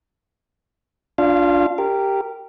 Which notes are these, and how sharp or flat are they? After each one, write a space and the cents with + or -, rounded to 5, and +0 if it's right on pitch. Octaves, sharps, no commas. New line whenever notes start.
D4 -15 F4 +15 F5 -25
G4 +0 A#4 -15